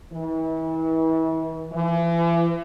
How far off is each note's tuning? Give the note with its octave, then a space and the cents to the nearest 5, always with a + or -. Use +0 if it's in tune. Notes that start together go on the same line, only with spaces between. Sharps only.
E3 -35
E3 +40